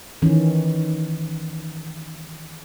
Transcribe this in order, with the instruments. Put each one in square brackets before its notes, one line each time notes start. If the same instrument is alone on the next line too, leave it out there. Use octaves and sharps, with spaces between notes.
[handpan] D#3 E3 C#4